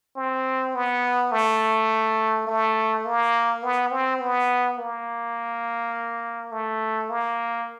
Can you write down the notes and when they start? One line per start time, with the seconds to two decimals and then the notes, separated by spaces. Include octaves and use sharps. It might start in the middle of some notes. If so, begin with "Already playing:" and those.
0.16 C4
0.75 B3
1.32 A3
2.47 A3
3.05 A#3
3.63 B3
3.91 C4
4.20 B3
4.77 A#3
6.51 A3
7.10 A#3